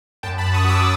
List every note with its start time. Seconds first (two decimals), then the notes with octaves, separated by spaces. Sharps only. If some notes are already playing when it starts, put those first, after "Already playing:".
0.23 F#2 G5 A5
0.38 A5 B5
0.44 F#2
0.54 C#6 D#6
0.65 F#3 D6 E6